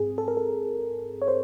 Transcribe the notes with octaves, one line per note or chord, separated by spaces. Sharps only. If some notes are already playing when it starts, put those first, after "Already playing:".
Already playing: G#2 C4 G#4
A4
A#4
A4
C#5
C5